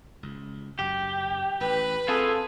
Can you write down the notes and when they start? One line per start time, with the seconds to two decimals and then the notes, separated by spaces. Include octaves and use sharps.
0.23 C#2
0.79 F#1 F#2 G4
1.60 A1 B4
2.08 C4 F4 G#4 A4